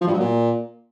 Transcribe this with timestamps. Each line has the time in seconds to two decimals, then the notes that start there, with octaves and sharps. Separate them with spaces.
0.01 F3
0.07 G2
0.13 F#3
0.20 A#2